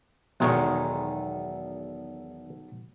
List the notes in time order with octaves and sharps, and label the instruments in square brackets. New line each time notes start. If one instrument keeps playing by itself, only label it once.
[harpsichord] B1 C#6 [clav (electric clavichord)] E2 D#3 G#3